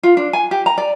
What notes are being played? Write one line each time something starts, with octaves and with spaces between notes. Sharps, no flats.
F4
D4
G#5
G4
A#5
D5